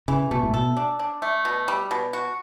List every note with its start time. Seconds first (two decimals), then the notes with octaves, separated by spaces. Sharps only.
0.08 C#3 E3
0.31 B2 A3
0.43 A2
0.53 B2 A4
0.77 D4
0.99 D4
1.22 A3
1.45 B2
1.68 G3
1.91 B2
2.13 F#4